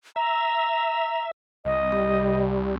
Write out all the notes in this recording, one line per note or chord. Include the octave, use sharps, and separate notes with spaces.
E5 A#5
C2 D#5
G3